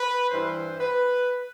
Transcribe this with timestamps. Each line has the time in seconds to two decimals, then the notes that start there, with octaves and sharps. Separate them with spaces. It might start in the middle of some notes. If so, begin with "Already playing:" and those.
Already playing: B4
0.31 G2 E3 G3 C5
0.79 B4